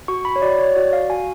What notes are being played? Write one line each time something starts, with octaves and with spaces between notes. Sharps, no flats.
F#4 C#6
B5
C#5
F#4 D5
C#5
F#4 D5
F5
F#4 G#5